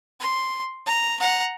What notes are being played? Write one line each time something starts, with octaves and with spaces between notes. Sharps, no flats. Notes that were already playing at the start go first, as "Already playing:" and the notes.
C6
A#5
F#5 A#5